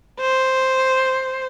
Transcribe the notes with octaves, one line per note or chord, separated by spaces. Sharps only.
C5